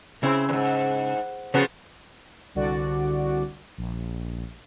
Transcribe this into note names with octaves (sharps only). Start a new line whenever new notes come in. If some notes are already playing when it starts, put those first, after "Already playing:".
C#3 C4 E4
E2 G#2
C#3 F3 B3 F#4
C2 D3 F#4 D5
A#1